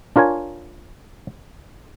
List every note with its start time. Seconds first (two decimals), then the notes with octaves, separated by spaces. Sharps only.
0.16 D4 F4 A#4 C#5 G#5